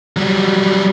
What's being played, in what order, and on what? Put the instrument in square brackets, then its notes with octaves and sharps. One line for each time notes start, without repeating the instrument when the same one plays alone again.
[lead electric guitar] F#3 G3